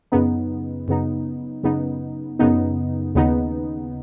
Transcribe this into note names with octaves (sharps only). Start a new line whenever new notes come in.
F#2 C#3 B3 D#4
F#2 C#3 B3 D#4
F#2 C#3 B3 D#4
F#2 C#3 B3 D#4
D#2 C#3 B3 D#4